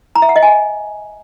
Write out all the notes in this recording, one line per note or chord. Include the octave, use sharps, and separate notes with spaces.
A#5
E5
F#5
D#5
G#5